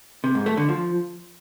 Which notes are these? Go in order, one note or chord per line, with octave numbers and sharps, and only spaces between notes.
C3
G#2
A3
D3
F3